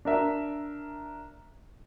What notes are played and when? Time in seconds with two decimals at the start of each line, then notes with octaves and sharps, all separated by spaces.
0.05 D4 A#4 E5